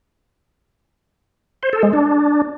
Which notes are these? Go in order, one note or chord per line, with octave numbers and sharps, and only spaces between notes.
C5
A4
G#3
D4